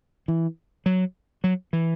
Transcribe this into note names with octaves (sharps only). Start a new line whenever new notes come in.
E3
F#3
F#3
E3